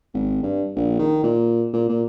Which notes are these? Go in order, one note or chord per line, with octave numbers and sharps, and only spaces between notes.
G#1
G2
A#1
D#3
A#2
A#2
A#2